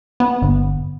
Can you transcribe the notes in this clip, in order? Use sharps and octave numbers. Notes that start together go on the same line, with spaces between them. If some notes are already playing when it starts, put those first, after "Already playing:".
B3
G1